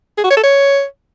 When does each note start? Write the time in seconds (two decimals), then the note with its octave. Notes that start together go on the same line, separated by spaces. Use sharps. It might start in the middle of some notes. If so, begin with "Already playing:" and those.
0.17 G#4
0.24 F#4
0.30 C#5
0.37 A4
0.43 C#5